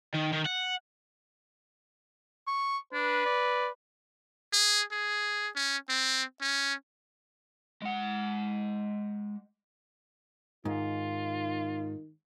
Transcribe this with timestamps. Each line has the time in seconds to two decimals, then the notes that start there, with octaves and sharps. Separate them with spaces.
0.15 D#3
0.33 D#3
0.46 F#5
2.47 C#6
2.93 D4 B4
3.25 D5
4.53 G#4
4.92 G#4
5.56 C#4
5.89 C4
6.41 C#4
7.82 G#3 F#5
10.65 G#2 D#3 F4